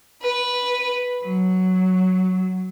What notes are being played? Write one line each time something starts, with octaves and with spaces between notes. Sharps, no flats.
B4
F#3